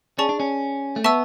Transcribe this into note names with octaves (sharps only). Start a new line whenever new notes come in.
C#4 G#4 D5 A5 C#6
D4
C#4
A3
B3 E5 A5 C#6 E6